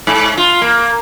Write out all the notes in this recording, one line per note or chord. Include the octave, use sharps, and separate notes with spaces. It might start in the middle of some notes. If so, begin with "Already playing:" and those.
G#2
F4
A#3